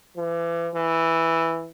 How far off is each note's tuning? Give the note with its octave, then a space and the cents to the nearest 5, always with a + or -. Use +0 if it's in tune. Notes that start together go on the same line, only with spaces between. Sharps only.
E3 +40
E3 +0